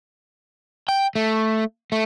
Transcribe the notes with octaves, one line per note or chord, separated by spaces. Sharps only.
G5
A3
A3